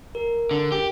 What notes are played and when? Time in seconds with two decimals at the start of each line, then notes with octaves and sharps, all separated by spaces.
0.15 A#4
0.51 D3
0.72 G4